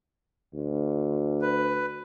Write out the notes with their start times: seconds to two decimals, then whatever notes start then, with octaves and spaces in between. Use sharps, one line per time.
0.54 D2
1.42 B4